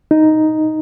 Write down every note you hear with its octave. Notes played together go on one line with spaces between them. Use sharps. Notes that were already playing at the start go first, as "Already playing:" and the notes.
D#4